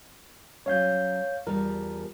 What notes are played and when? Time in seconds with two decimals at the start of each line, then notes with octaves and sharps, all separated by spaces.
0.66 F#3 C#4 C#5 F5 G6
1.47 E2 F3 G3 A#4